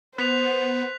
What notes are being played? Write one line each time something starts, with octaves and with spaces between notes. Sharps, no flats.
B3 C5 F#6 B6 F7